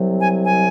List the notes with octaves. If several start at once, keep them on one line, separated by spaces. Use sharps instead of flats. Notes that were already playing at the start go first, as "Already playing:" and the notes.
Already playing: C2 C3 F#3
G#5
G#5